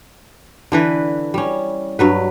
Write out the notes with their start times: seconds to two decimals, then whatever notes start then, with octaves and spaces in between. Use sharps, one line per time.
0.72 D3 E3 B4
1.34 G3 C#4
1.99 G2 F#3 B4